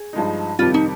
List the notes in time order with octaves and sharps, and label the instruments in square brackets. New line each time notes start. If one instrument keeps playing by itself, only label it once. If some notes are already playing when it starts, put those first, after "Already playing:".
Already playing: [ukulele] G#4
[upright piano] G2 F3 G#3 D#4
[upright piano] F2 C3 D#3 G3 [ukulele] F4
[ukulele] D#4